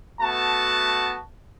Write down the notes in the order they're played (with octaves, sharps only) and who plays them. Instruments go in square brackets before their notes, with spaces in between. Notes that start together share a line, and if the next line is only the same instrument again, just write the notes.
[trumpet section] A3 B3 F#4 A5